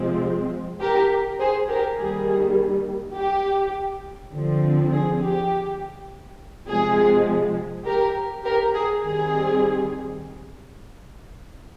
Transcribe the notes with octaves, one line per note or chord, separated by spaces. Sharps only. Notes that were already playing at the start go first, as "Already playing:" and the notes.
Already playing: C3 F3 G#3 C4
G4 A#4
G#4 C5
G4 A#4
D#3 G3 A#3 G#4
G4
D3 F3 C4
G#4
G4
C3 F3 G#3 G#4
G4 A#4
G4 A#4
G#4
D#3 G3 C4 G#4